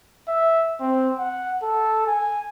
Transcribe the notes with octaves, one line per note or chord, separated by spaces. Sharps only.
E5
C4
F#5
A4
G#5